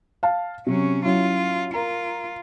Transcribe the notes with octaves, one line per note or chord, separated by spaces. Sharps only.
F5 A5
C3 F#3 C#4
F#3 C#4 E4 F4
F4 A#4 A#5